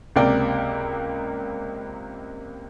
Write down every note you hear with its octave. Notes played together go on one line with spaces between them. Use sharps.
C#2 C3 A#3 A#4 D5 G5